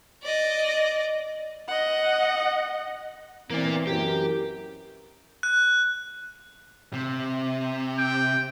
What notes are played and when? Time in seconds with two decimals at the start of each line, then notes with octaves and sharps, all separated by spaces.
0.23 D5 D#5
1.68 D#5 F#5
3.50 E3 A#3 C4 D5
3.87 F#2 E3 G4 A#4
5.43 F#6
6.93 C3
7.98 G5